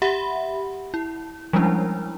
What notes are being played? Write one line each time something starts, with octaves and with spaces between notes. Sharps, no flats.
G4 E5 F#5 B5
E4
F3 G3 G#3 C#4 D4 E4